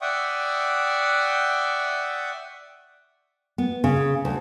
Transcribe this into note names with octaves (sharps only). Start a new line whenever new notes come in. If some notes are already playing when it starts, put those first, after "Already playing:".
D5 E5 F#5 G5 C#6 D#6
B3
C#3
D2